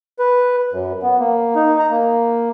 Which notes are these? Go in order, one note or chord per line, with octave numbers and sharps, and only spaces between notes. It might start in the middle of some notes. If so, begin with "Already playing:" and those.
B4
F#2
B3
A#3
D#4
A#5
A#3